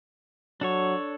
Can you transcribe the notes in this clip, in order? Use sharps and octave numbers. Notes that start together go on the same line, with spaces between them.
F#3 D4 A4 C#5